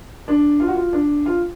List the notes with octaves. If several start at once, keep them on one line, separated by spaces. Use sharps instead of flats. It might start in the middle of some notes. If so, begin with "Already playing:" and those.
D4
F4
F#4
F4
D4
F4